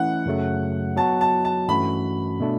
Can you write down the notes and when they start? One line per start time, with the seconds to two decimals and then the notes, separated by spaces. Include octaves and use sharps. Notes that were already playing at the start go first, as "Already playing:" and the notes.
Already playing: E3 A3 C#4 E4 F#5
0.26 F#2 C#3 F#3 A3
0.97 F#3 B3 F#4 A5
1.21 A5
1.45 A5
1.68 G2 E3 A3 C#4 F#4 B5
2.40 B2 A3 D4